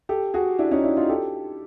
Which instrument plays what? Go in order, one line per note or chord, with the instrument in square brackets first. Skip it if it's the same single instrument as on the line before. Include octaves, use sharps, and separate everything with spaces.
[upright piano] G4 A4
F#4 G#4
D4 E4
C#4 D#4
D4 E4
D#4 F4
G4 A4